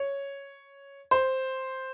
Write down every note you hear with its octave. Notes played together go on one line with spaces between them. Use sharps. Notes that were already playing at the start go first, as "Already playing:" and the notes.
Already playing: C#5
C5